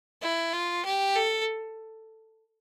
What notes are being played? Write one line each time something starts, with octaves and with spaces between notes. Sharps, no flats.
E4
F4
G4
A4